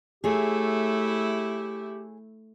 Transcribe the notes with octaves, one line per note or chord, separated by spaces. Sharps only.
A3 E4 G4 G#4 C#5